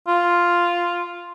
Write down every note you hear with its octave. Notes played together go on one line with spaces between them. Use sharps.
F4